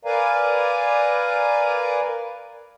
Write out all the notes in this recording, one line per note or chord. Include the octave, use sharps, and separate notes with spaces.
A#4 B4 D5 F5 G#5 A#5